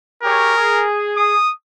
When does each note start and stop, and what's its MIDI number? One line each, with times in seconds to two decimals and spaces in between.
0.23 0.54 67
0.23 0.54 68
0.23 0.86 70
0.23 0.54 73
0.56 1.35 68
1.17 1.53 87